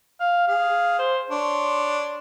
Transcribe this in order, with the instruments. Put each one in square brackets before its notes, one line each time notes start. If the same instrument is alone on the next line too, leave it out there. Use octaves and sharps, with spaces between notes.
[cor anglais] F5
[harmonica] G#4 [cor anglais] F5
[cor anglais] C5
[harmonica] D4 C6 [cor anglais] C#5